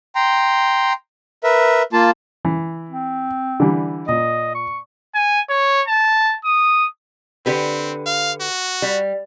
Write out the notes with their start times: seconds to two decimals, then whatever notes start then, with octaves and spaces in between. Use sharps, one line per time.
0.15 G5 A#5 C6
1.44 A#4 B4 E5
1.93 A#3 F4 A5
2.45 E3
2.90 C4
3.60 D3 E3 G3
4.08 A#2 D#5
4.55 C#6
5.15 G#5
5.50 C#5
5.88 A5
6.45 D#6
7.46 D3 C4 G4 B4
8.06 F5
8.41 F#4
8.82 G3